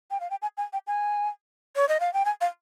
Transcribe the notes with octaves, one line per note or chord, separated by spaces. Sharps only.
G5
F5
G5
G#5
G#5
G5
G#5
C#5
D#5
F5
G5
G#5
F5